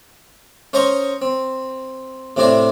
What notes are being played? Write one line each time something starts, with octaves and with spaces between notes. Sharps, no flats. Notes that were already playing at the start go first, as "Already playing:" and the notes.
C#4 C5 D#5 A#5 C6 C#6
C4
A2 C3 C4 D4 E4 D5